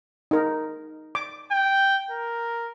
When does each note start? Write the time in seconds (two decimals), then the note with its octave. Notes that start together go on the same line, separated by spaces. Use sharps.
0.31 D#4 A#4
1.15 D6
1.51 G5
2.10 A#4